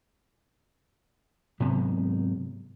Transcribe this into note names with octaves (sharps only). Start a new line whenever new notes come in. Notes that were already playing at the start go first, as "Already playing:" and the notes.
G#2 C3 F#3 B3